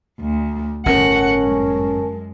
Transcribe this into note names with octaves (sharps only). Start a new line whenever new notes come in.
D2
G1 A2 C#4 A#4 F#5 A5
F#2 G#3